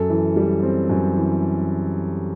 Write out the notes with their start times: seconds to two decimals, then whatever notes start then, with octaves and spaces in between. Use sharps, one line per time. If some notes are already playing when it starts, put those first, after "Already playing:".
Already playing: F#2 A4
0.10 E3
0.36 G3
0.63 C4
0.89 F#2
1.16 E3